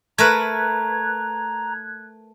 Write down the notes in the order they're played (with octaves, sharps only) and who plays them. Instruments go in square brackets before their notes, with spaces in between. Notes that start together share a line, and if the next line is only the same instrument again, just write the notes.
[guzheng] A3 A#4 B4 [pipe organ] A#5 [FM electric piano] F#6 G#6